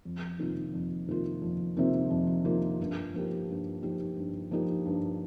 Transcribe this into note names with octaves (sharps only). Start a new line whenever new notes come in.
F2
C3 D#3 A#3 F4
F2
C3 D#3 A#3 F4
F2
C3 D#3 A#3 F4
F2
C3 D#3 A#3 F4
G2
F3 A#3 D#4 G4
G2
F3 A#3 D#4 G4
G2
F3 A#3 D#4 G4
G2